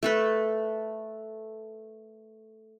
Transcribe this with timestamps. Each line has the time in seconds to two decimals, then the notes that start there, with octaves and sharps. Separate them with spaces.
0.03 A3 A4 B4